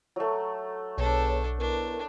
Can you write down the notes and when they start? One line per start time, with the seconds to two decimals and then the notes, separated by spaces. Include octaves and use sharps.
0.16 F#3 A3
0.98 B1 B3 D4 G#4 A4 C#5
1.59 B3 D4 E4 A#4